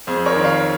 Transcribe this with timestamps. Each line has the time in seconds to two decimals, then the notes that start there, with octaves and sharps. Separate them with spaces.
0.07 F2 G#4 C5
0.25 A#4 C#5
0.35 D#3
0.44 C#5 F5